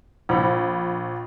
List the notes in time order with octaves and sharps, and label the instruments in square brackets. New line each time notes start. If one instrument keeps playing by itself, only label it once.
[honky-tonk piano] A#1 B5